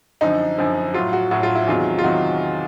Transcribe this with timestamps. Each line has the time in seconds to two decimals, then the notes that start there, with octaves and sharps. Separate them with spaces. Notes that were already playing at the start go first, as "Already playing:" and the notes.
0.21 F#2 D3 F3 D#4
0.58 F#2 D3 F3
0.94 A2 F#3 F4
1.13 F#4
1.31 A2 F#3 F#4
1.43 F4
1.55 E4
1.67 E2 C3 D#3 F#3 F4
1.99 F4
2.04 C3 D#3 F#3 F#4